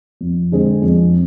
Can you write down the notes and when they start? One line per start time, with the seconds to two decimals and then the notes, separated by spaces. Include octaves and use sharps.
0.21 F2
0.52 D3 G#3 C4 G#4
0.82 F2